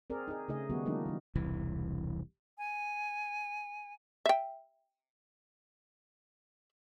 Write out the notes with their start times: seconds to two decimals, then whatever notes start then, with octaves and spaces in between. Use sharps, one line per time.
0.10 C4 G#4 A#4 D5
0.28 D#4 G#4
0.48 C#3 A3 D#4 G#4 D#5
0.70 D#3 G3 B3 F#4
0.85 E3 F#3 G#3 A#3 D4 D#4
1.05 D#3 F#3
1.35 E1 C2 E3
2.58 G#5
4.26 E5 G5